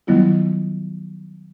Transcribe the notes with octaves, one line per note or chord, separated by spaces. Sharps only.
D#3 F#3 G3 B3 E4 F4